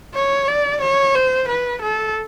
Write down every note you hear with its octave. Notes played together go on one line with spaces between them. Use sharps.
C#5
D5
C#5
C5
B4
A4